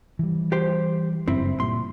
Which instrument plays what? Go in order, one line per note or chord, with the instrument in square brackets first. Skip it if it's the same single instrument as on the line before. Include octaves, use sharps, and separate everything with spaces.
[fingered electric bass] E3 G3
[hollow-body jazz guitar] G4 C5
[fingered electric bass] F#1 G2 [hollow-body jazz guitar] C4 E4
[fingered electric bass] A#2 G3 [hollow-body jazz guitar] C6